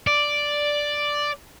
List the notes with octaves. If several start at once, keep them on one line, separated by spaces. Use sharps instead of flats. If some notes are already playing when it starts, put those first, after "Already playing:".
D5